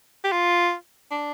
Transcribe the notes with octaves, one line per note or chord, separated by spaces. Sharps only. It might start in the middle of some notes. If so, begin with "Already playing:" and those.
G4
F4
D4